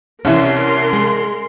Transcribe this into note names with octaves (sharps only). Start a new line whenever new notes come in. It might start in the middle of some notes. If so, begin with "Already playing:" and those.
C2 E3 C#4 A#4 E5 C6
G#3